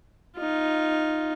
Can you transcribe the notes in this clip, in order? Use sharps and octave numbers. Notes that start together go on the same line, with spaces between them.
D#4 F4